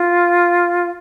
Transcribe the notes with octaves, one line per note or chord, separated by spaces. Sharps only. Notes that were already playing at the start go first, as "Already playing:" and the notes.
Already playing: F4